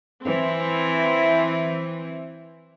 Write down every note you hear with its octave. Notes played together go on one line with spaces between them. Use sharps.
E3 C4